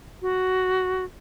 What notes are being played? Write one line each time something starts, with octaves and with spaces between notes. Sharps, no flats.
F#4